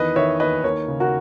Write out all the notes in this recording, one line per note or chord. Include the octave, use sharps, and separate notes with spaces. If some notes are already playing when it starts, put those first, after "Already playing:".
Already playing: E2 D#3 B4 D#5
D#3 C#5 E5
D#2 B4 D#5
D#2 A#4 C#5
C#3
F#4 A#4